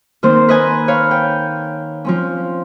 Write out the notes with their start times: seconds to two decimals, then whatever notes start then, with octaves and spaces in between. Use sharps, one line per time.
0.23 D#3 A#3 C4 C5
0.49 B4 D#5 G#5
0.88 C#5 F5 B5
1.11 G5
2.05 F3 C4 C#4